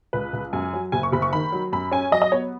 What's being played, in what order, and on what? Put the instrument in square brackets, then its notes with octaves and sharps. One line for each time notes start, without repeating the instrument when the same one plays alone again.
[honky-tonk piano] C#2 B4
C#2
F#2 G#5
F#3
F#1 G#5
C#6
F#1 B5
C#6
D#3 B5
F#3
F#2 B5
C#4 G#5
F#3 D#5
D#5
B3 C#5